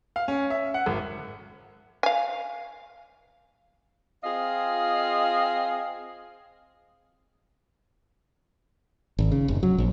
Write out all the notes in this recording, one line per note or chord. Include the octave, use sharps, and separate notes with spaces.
F5
C#4
E5
F#5
G#1
F5 G#5
C4 F4 G#4 D#5 F5
G#1
C#3
F1
F#3
A#1